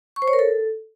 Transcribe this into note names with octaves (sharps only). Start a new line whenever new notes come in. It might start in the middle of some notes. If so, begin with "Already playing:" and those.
C#6
C5
C#5
A#4
A4